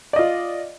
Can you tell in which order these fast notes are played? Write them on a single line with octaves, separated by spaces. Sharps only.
D5 D#5 F4